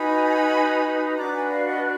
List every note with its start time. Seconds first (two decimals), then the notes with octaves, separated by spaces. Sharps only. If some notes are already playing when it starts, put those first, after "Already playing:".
Already playing: D#4 F#4 B4 G#5 B5
1.16 D4 F#4 B4 A#5 D6
1.33 G#5 B5
1.50 D5 F5
1.67 D#5 F#5